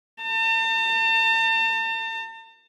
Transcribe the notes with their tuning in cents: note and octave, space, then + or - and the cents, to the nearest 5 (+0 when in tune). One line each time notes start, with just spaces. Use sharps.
A5 +45